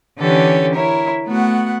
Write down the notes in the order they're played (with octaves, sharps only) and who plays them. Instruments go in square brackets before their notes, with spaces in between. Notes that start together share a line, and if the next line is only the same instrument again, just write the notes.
[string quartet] D3 E3 C#4 G4 A4 C#5
E4 A#4 C#5
A3 B3 F#4 F#5